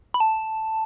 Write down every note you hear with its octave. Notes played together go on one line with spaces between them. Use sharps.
B5
A5